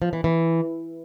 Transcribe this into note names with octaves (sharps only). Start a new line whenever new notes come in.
F3
E3
E3